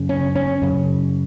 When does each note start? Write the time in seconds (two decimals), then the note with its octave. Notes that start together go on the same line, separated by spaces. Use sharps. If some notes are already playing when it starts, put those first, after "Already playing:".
Already playing: F#2 C#3
0.09 C#4
0.35 C#4
0.62 F#2 C#3